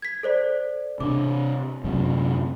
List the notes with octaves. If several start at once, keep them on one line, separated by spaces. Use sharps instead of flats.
G#6 B6
A4 C5 D5
C3 D4 D6
F#2 C3